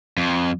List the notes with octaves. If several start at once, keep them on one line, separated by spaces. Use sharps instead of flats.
F2